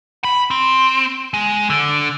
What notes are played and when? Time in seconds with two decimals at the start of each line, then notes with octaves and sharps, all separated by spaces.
0.25 B5
0.51 C4
1.34 G#3
1.70 D3